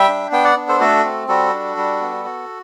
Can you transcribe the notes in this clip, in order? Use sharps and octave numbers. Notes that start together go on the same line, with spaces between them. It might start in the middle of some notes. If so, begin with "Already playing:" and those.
Already playing: G3 E5 G5
D4
B3 G5
D5 F#5
D4
A4 C5
A3 F#4 A4
C4
G3 F#4 A4
D4
G3
B3
F#4